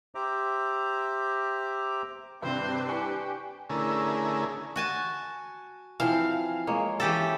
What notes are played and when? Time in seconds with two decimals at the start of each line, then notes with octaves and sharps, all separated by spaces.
0.15 G4 C5 E5 A#5 D6
2.42 G2 C3 C4 D4 B4 C5
2.88 G4 G#5 C#6 F#6
3.70 D3 A3 C#4 E4 G#4 A#4
4.76 F#4 G#5 A5
6.00 E3 F3 C4 F5
6.67 G#3 A#3 C#5
7.00 E3 C#4 G4 A4